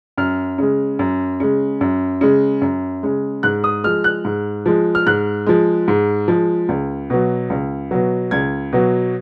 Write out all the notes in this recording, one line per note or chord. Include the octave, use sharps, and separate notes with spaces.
F#2 F6
C#3 G#3
F#2
C#3 G#3
F#2
C#3 G#3
F#2
C#3 G#3
G#2 F#6
D#6
F3 G#3 F6
F#6
G#2
F3 G#3
F6
G#2 F#6
F3 G#3
G#2
F3 G#3
C#2
B2 F#3
C#2
B2 F#3
C#2 G#6
B2 F#3